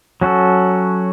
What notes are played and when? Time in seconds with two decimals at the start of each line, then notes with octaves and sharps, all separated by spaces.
0.21 F#3 C#4 F#4 A4